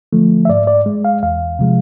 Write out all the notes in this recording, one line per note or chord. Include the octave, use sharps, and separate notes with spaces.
D3 F3 A3
E5
G#2 D5
D5
G#3
F5
E2 F5
C3 F3 G#3